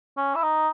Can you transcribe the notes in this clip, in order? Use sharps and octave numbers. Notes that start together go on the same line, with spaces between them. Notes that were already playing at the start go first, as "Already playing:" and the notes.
C#4
E4
D#4